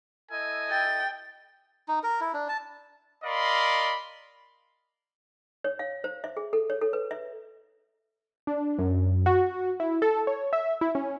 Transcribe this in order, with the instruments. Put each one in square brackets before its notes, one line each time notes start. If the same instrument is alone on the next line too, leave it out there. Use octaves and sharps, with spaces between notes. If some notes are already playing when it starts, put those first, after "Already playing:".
[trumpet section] E4 A4 D#5 [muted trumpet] G#5
[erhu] G5 [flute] A6
[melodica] D#4
A#4
E4
D4
A5
[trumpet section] A#4 D5 D#5 F5 B5 C6
[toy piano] C#5
F5
C5
E5
G#4
A4
C#5
A4
B4
E5
[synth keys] D4
F#2
F#4
E4
A4
C#5
E5
E4
C#4